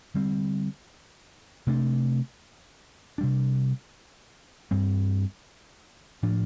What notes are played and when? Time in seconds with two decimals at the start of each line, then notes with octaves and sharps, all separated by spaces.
0.14 D3 G3 C4
1.67 C3 A3 D4
3.18 C3 G3 D4
4.71 G2 G3 C4
6.23 A2 F3 D4